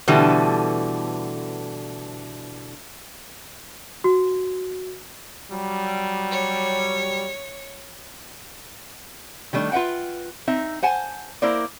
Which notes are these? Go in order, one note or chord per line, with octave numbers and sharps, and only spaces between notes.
B2 D3 E3 G3 A3
F#4
F#3 G3
C#5
D#3 G3 A3 D4
F4 B4 E5 F#5 G5
C4 D#4 E5
C5 F#5 G#5 A5
A#3 E4 A#4 C5 D5